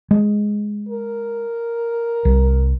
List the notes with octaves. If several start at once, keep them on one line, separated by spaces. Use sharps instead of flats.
G#3
A#4
C2